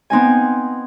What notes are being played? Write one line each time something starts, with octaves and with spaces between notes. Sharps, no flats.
B3 C4 D#4 G#5